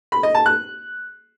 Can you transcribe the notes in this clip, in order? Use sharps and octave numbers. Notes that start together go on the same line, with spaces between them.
B5
D#5
A5
F#6